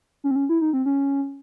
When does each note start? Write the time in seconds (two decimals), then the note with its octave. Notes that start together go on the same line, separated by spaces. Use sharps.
0.24 C#4
0.31 C4
0.36 C#4
0.49 E4
0.61 D#4
0.73 C4
0.86 C#4